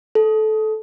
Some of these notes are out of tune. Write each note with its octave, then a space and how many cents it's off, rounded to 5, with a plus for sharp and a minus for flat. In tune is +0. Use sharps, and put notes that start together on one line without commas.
A4 -20